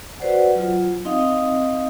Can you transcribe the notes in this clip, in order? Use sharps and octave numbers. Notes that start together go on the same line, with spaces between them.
F#4 B4 C5 D5 F#5
F#3 F4
C4 D#4 D#5 F5 D#6